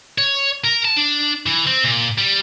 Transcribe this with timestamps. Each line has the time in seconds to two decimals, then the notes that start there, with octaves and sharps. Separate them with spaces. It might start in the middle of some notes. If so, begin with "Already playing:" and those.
0.18 C#5
0.64 A#4
0.85 A5
0.97 D4
1.46 E3
1.67 C4
1.84 A#2
2.18 G3